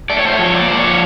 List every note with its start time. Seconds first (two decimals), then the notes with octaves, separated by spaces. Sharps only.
0.10 A3 D5
0.19 C#5
0.25 A3 C5
0.36 F3 C#5
0.54 A#2 D5
0.68 A#2 C5
0.77 C#5
0.84 F3